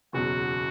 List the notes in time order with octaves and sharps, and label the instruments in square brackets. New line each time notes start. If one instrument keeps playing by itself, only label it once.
[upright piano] F#1 E2 B2 F#3 [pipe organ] F#4